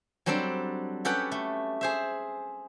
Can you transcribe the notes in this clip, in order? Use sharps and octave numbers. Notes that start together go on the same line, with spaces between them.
F#3 G3 C4 D4 A4 D5
C#4 G4 A4 B4 F#5 G5
A3
G#4 C5 E5